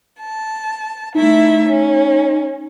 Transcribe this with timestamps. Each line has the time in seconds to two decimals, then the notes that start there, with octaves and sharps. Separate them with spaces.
0.19 A5
1.15 A3 D#4 E4 E5
1.68 C#4